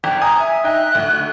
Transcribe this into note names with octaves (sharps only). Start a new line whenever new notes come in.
G1 G5
G#5 A#5 D#6
E5
D#4 G5 F#6
D2